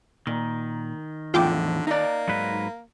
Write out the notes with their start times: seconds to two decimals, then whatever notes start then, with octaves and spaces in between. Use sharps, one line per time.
0.27 A#2 D#3
1.34 E2 A2 D3 F3 F4 G5 D6
1.87 A#3 D#4 D5
2.29 G#2 F#3 B4